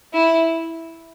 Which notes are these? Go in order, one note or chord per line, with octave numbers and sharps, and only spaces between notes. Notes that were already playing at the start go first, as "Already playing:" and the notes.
E4